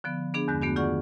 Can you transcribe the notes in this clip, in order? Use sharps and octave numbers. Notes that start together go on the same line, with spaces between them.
D3 F3 B3
B3 D4 G#4
E2 G2 D3 G#3 G6
A3 B3 D4 F#4
D#3 F4 G#4 D5 F#5 C#6